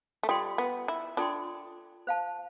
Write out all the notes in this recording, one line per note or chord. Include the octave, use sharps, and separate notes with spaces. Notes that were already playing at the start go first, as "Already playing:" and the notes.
A3
G3 F4 A4 D5 G5 C6
B3
E4
D4 F4 A4 D5 G5 C6
C5 F5 A5